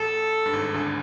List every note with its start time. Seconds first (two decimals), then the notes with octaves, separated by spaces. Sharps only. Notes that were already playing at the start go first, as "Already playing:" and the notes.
Already playing: A1 A2 A4
0.46 G2
0.53 G#1 G#2
0.74 D2 D3